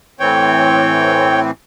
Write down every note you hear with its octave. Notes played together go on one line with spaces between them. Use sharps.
A2 E3 C4 C#5 G5